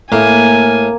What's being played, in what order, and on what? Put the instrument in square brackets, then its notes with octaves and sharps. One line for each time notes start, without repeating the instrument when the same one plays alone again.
[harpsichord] A2 [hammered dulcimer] A#3 [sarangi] G#5